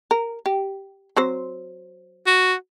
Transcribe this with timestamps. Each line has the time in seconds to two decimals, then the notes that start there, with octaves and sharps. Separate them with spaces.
0.11 A#4
0.46 G4
1.16 F#3 C4 C5
2.27 F#4